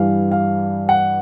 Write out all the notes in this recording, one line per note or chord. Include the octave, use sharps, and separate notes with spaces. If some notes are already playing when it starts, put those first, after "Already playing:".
Already playing: G2 E3 G3 F5
F5
F#5